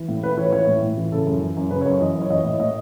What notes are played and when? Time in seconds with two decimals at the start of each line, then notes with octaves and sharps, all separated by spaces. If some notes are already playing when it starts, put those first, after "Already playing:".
Already playing: E3
0.08 A2
0.23 A2 B4
0.37 E3 C#5
0.45 B4
0.52 E3 C#5
0.67 A2
0.82 A2
0.98 E3
1.12 C#3 A4
1.27 F#2
1.41 E3
1.57 F#2
1.71 C#3 B4
1.81 C#5
1.86 F#2
1.91 C#5
2.00 E3 D#5
2.15 F#2
2.22 C#5
2.30 E3 D#5
2.44 A2 C#5
2.59 A2 D#5